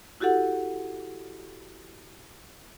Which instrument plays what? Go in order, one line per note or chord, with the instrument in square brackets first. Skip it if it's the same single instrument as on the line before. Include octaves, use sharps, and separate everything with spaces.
[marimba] E4 F#4 G4 A4 F#5